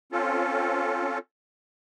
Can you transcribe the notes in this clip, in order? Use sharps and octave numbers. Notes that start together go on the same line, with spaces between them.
C4 C#4 F4 A4